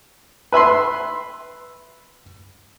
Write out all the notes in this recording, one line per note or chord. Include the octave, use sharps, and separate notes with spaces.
B4 E5 B5 C6